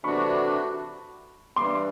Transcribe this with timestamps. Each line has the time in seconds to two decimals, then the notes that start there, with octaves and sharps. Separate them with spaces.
0.04 C3 E3 A3 D4 F#4 B5 C#6
1.56 G2 E3 G3 C6 D6